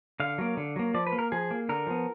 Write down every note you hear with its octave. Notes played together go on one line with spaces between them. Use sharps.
D3 F5
F#3 A#3
D3
F#3 A#3
F3 D5
B4
A#3
A#4
F3 G#4
A#3
D3 A#4
F3 B3